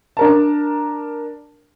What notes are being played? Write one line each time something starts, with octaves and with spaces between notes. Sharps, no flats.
D4 A#4 A5